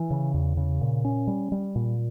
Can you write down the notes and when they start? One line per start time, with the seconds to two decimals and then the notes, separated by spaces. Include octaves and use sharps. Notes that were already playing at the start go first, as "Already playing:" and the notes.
Already playing: E3
0.10 C#3
0.34 E2
0.57 C#3
0.81 A#2
1.05 C#4
1.27 G3
1.52 G3
1.75 A#2